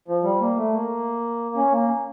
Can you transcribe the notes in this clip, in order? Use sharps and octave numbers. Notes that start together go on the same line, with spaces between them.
F3
G3
A#3
A3
A#3
C#4
A#3